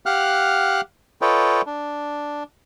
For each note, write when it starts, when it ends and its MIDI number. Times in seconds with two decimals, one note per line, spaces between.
0.06 0.81 67
0.06 0.81 77
0.06 0.81 78
0.06 0.81 89
0.06 0.81 90
1.21 1.62 65
1.21 1.62 69
1.21 1.62 71
1.21 1.62 73
1.21 1.62 75
1.21 1.62 79
1.66 2.43 62